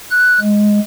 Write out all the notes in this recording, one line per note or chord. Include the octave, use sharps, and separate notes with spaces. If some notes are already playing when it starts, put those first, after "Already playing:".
F#6
G#3